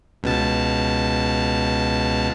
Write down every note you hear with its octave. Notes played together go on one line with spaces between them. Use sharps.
C#2 B2 A5